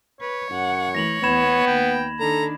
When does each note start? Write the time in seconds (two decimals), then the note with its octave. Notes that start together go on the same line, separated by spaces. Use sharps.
0.21 B4 C#5
0.51 F#2 F#5
0.95 E3 A3 A#6 F7 F#7
1.24 E2 B3 B5 G#6 E7
1.67 D#2 G5
2.20 D#3 D4 A4 A#5